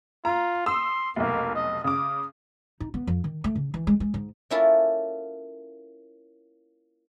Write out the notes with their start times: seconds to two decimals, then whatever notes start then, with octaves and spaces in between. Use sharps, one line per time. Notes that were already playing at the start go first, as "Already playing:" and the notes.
0.25 F4 A#5
0.66 C6 D#6 E6
1.16 F1 B1 A#3
1.55 D#5
1.84 C#3 D6 D#6
2.80 D#4
2.94 B3
3.07 F2
3.24 D#3
3.44 A3
3.55 C#3
3.74 E3
3.87 G#3
4.00 G#3
4.14 G#2
4.50 A#3 C#4 E4 F4 A4